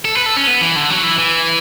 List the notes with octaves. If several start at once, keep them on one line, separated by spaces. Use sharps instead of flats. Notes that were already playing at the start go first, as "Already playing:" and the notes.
A4
B4
A4
C#4
B3
E3
D3
F#3
E3
E3